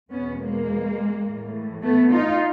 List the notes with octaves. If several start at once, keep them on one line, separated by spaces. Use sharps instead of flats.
E2 B2 B3 C#4
G#3 A#3
A2 E3
A3 B3
D#4 F4